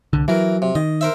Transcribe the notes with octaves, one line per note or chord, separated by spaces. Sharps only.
C2 D3
E3 F#3 A#4
C3
D#3 D#5
A#4 C5 E5